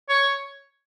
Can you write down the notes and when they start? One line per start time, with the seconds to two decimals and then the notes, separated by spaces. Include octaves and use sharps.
0.09 C#5